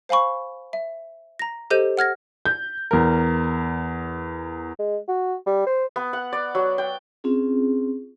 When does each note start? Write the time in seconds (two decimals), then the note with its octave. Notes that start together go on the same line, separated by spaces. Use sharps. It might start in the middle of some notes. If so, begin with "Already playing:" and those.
0.09 C5 F5 G#5 B5 C#6
0.73 E5
1.39 A#5 A#6
1.70 G4 A4 C5 D#5 G6 D#7
1.97 F#5 F6 G#6 A#6
2.45 G6
2.91 E2 A#4
4.79 G#3
5.08 F#4
5.46 G3
5.67 C5
5.96 B3
6.13 F#5
6.33 D5
6.55 F#3
6.78 G5
7.24 C4 C#4 F4 G#4